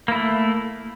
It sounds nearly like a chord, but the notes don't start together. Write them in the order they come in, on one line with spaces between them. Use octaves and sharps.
A#3 E4 A3